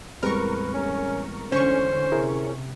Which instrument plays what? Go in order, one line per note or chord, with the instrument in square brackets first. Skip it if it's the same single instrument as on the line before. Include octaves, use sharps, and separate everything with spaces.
[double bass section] E2 A2 [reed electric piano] G3 G#3 C4 [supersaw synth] A#4 C#6 [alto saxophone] B4
[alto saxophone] C#4
[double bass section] E2 D3 [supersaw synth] C#4 C#6 [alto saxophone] C5
[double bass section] C3 [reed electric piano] E4 G#4 A#4